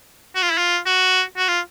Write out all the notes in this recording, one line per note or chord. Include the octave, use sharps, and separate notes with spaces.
F#4
F4
E4
F4
F#4
F#4
F4